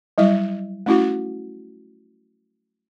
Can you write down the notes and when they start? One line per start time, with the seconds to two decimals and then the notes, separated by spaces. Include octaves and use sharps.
0.18 F#3 G3 E4 D#5
0.86 A3 C#4 E4 F#4